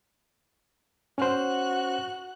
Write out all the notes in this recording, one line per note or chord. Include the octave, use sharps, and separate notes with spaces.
C#4 F#4 C5 F#6